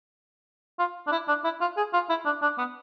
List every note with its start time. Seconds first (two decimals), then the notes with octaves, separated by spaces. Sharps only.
0.79 F4
1.07 D4
1.12 E4
1.28 D4
1.44 E4
1.61 F4
1.77 G#4
1.93 F4
2.10 E4
2.26 D4
2.42 D4
2.58 B3